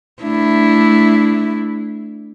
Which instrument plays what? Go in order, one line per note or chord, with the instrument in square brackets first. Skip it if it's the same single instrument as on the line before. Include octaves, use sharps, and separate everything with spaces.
[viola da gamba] A3 D4 E4